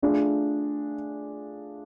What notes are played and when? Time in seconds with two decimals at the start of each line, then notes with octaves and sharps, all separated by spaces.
0.02 A3 D4 F4 G#4